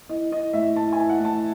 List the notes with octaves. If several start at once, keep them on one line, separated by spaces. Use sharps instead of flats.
E3 D#5
E3 D#5
A2 E5
E3 A5
G#5
E3
F#5
A2
A5